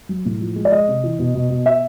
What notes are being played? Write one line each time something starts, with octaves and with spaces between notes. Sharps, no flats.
F#3
A2
F3
G#3
D5
G#3 D#5
C3
E3
B2
B2
B2
B3 E5